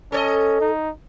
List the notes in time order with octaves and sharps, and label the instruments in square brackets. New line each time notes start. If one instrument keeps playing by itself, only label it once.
[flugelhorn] C#4 [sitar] A4 C#5 D#5
[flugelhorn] D#4